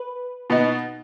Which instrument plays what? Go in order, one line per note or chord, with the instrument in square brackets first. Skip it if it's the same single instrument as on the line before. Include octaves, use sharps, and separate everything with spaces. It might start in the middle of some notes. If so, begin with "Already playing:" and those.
Already playing: [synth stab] B4
[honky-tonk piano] B2 B3 D#4